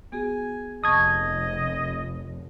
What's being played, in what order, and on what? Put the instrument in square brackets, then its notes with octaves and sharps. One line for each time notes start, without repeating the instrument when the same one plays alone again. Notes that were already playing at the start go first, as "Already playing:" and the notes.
[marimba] B3 F#4 G#4 [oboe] G#5
[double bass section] F1 [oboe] D#5 [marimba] A5 C#6 [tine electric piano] D#6 G#6